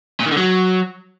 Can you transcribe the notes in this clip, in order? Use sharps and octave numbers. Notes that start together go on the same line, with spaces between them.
A#2
D#3
D3
F#3